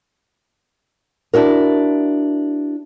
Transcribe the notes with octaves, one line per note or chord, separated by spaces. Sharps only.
D4 E4 F#4 A#4